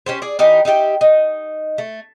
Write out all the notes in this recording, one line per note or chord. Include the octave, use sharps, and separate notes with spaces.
C#4 G4 C5
G#4 D5
E3 D#4 G4 A#4
D#4 E4 G4 G5
D#4
A3